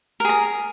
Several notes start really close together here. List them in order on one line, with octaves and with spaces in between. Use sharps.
A#4 G#4 A#5